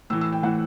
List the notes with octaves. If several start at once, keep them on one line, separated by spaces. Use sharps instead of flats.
A2 E3 E6
E6
G5
A2 E3 F#5